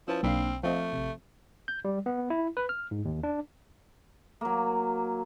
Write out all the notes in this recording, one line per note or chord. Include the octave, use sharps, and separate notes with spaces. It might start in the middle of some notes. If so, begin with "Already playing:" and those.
F3 C#4 E4 B4 A5 E6
B1 A#3 C4 D4 F5 B5 C7
F3 A3 C4 C5 D#5 F5
A1 C3
G6
G3
B3
E4
B4
F6
G#2
D#2
D4
F#3 A#3